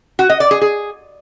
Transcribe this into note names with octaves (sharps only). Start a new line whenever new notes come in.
F#4
D#5
D5
G#4
G#4